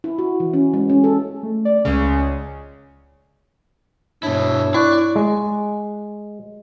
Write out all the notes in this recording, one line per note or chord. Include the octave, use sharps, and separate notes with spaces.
E4
F#4
E3
C#4
G#3
C#4
A4
A3
D5
C#2 C#3
G2 B2 D4 E4 C#5
E4 D5 C#6 F#6
G#3